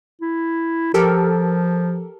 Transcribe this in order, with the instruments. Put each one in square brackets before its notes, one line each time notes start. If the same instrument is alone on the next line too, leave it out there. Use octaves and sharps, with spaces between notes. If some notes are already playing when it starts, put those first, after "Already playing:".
[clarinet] E4
[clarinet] F3 [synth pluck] G4 A4 A#4